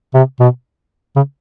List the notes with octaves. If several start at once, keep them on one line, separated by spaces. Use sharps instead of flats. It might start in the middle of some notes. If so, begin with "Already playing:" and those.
C3
B2
C#3